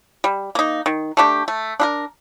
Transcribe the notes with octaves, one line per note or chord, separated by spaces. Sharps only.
G3
A#3 D#4
D#3
A3 D4 G4
A3
D4 G4 A#4